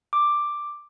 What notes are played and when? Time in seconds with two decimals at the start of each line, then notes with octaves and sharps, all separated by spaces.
0.13 D6